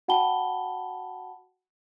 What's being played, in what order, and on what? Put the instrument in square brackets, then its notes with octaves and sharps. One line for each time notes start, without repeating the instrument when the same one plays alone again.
[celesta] F#4 F#5 G5 A5 B5 G7